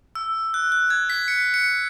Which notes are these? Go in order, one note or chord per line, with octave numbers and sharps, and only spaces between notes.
E6
F#6
F#6
G#6
B6
C#7
C#7